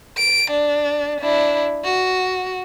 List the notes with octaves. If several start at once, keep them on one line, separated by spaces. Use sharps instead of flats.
D7
D4
D4 E4
F#4